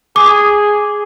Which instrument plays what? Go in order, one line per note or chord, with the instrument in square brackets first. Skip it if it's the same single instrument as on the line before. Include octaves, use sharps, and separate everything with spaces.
[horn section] G#4 [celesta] D6